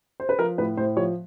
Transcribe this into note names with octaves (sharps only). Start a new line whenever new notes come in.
C5
B4
F3 A#4
A2 B4
A2 C5
F3 C#5